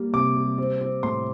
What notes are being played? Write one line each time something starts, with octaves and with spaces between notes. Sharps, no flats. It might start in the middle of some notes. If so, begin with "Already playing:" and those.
Already playing: G3 A#3
C3 D6
G3
C4
C4
A2 C6